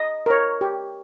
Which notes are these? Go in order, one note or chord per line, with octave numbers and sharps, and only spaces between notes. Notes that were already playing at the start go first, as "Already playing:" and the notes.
Already playing: D#5
A#4 C#5
G4